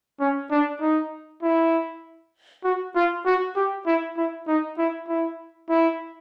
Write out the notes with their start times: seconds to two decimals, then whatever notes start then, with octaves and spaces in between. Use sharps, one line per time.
0.20 C#4
0.51 D4
0.81 D#4
1.43 E4
2.64 F#4
2.95 F4
3.26 F#4
3.56 G4
3.86 E4
4.17 E4
4.48 D#4
4.78 E4
5.09 E4
5.69 E4